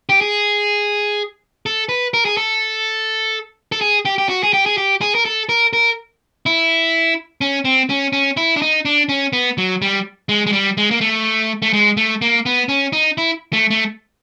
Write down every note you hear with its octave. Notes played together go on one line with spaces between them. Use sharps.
G4
G#4
A4
B4
A#4
G#4
A4
A4
G#4
G4
G4
F#4
G#4
G4
G#4
G4
G#4
A#4
A4
A#4
A#4
E4
C#4
C4
C#4
C#4
E4
D4
D#4
D4
C#4
B3
F#3
G3
G#3
G#3
G3
G#3
A#3
A3
A3
G#3
A3
A#3
B3
C#4
D#4
E4
A3
A3